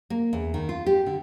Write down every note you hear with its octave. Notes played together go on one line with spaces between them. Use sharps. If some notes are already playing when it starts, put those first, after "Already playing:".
A#3
E2
D#3
F4
G4
D3